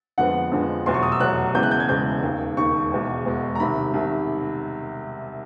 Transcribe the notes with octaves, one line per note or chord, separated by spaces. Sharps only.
F2 D3 F3 G#3 B3 F#5
F2 D3 F3 G#3 B3
F1 E2 B2 F#3 C6
C#6
D#6
E6
F1 E2 B2 F#3 F#6
E1 E2 C#3 E3 G#3 G6
F#6
G6
G#6
E1 E2 C#3 E3 G#3 G6
E1 D#2 D#3
E1 D#2 D#3 C#6
E1 E2 B2 G#3
E1 E2 B2 G#3
A#5
C2 C3 D#3 B5
C2 C3 D#3